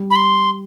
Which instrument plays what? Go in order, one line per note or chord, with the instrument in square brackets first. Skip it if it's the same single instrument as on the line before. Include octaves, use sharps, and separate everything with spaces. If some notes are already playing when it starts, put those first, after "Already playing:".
Already playing: [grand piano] G3
[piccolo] B5
C6